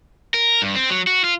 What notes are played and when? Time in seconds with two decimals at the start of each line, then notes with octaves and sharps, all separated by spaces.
0.34 A#4
0.62 G2
0.75 C4
0.90 F#3
1.07 F#4
1.24 F4